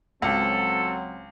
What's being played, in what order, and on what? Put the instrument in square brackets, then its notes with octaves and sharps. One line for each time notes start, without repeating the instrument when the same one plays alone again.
[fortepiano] C#2 [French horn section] F#3 C4 [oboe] A4